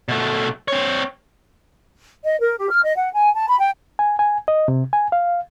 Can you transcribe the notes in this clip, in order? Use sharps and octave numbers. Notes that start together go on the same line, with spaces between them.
B2 A3
C4 C#5
D#5
A#4
G4
F6
D#5
F#5
G#5
A5
B5
G5
G#5
G#5
D#5
C3
G#5
F5